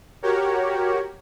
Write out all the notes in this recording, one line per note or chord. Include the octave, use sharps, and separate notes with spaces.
F#4 G4 A#4 C#5